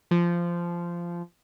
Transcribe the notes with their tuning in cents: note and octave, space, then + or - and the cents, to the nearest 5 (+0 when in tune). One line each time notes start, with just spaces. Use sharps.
F3 -15